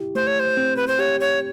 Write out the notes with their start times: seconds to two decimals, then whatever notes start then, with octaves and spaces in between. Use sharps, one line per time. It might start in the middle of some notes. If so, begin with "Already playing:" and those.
Already playing: E4 G4
0.15 A3 C5
0.27 C#5
0.39 C5
0.57 C4
0.76 B4
0.87 C5
0.99 G4 C#5
1.20 C#5